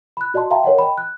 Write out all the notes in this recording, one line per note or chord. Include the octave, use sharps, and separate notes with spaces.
B5 F#6
F#4 D5 D#5 A5 C6
E5 F5 G5 A5 A#5 C6
A#4 C#5 D#5 F#5
D#5 G5 B5
F#6